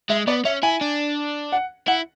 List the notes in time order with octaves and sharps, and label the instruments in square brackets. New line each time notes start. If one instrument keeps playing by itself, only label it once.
[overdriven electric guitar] G#3 [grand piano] E5
[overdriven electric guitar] B3 [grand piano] D5
[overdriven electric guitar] C#4 [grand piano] E5
[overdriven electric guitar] E4 [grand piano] G#5
[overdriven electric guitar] D4
[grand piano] F#5
[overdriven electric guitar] E4 [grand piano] F#5